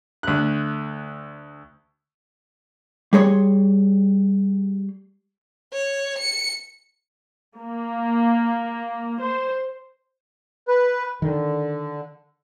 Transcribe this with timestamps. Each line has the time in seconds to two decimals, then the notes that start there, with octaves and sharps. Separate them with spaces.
0.23 D2 F#6
3.13 G3 G#4 C#5 C6
5.73 C#5
6.18 C#7
7.59 A#3
9.20 C5
10.68 B4
11.22 D3 D#3